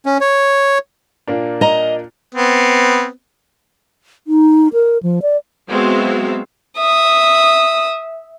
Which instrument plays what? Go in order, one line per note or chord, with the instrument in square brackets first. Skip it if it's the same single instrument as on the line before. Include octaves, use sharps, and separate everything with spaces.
[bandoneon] C#4
C#5
[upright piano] A#2 A#3 D4
[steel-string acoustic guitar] D#5 A#5
[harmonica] B3 C4
[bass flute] D#4
A#4
F3
D5
[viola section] F#3 G#3 B3 C4 E5 F5
[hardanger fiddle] E5 D#6